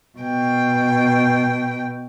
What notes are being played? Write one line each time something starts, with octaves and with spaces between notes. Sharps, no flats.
B2 G5